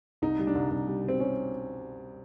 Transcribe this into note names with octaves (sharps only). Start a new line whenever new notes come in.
C2 D#4
G3
D4
C2
C2
G3
B2 C4
G3 C#4